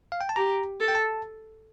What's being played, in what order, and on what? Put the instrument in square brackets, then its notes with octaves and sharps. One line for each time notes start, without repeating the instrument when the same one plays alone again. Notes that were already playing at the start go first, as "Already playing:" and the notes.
[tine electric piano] F5
G5
A5
[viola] G4 [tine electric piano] A#5
[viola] A4
[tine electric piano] G5
A5